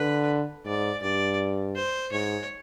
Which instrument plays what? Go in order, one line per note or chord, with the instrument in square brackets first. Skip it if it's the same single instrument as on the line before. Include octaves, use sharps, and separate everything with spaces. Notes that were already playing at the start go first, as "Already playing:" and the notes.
Already playing: [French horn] D3 [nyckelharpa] B4
[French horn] G#2 [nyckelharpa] D5
[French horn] G2 [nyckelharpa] D5
[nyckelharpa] C5
[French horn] G#2 [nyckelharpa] C#5